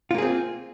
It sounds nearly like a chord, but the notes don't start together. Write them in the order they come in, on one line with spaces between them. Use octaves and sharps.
F4 A#3 G#4 C4